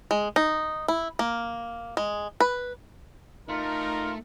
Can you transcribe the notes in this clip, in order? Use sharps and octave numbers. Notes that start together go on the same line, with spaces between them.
G#3
D#4
E4
A#3
G#3
B4
A3 D#4 F4 A#4